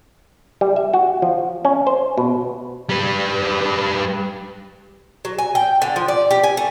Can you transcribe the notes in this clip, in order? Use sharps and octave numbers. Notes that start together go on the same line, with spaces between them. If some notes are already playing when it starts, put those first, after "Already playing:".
G3
E5
F#4
F3
C#4
C5
B2
G3 B4
F#3
G#5
G5
D3
F3
D5
G4
G#5
A3